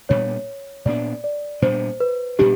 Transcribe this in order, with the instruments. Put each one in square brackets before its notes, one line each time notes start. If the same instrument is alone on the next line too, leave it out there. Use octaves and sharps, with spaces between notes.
[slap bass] A#2 G3 B3 D4 [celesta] C#5
[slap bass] A#2 G3 B3 D4 [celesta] D5
[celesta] D5
[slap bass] A#2 G3 B3 D4 [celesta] C5
[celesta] B4
[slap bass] A#2 G3 B3 D4 [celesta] G4